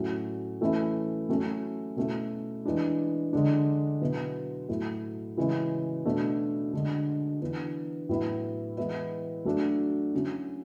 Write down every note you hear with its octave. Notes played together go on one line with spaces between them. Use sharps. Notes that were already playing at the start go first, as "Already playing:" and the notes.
Already playing: A2 F#3 A3 C#4
E3 A3 C#4 E4
F#3 A3 C#4 E4
B2 A3 C#4 E4
E3 G#3 D4
D3 G#3 D4
B2 F#3 B3 E4
A2 F#3 A3 E4
C#3 E3 G#3 C#4 E4
B2 A3 D4
D3 G#3 D4
E3 B3 D4
A2 F#3 B3 E4
E3 G#3 B3 E4
F#3 A3 D4
F#3 C#4 E4